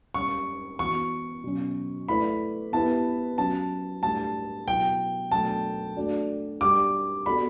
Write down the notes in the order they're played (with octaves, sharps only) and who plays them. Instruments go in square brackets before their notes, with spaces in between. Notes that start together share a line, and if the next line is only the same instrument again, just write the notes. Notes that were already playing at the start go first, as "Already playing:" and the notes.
[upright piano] G3 C#4 G4 C#5 [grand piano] C#6
[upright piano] E3 B3 F#4 [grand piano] C#6
[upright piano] B2 F#3 C#4
[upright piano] A3 E4 B4 D5 [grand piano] B5
[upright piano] B3 E4 G4 B4 [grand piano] A5
[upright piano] F#3 C#4 F#4 [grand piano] A5
[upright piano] A2 G3 D4 G4 [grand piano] A5
[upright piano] B2 F#3 B3 E4 [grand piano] G5
[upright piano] B2 F#3 A3 D4 [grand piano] A5
[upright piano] A3 D4 F#4
[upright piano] G3 D4 G4 [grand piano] D6
[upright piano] B3 F#4 A4 D5 [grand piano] B5